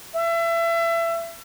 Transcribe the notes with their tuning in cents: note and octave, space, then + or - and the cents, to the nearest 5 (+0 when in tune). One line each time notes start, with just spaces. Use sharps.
E5 +30